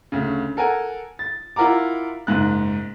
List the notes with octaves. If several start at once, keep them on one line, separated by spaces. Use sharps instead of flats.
D2 C#3
A4 A#4 F#5 G#5
A6
E4 F4 A#4 F#5 A#5 D6
F#1 G#2 F#6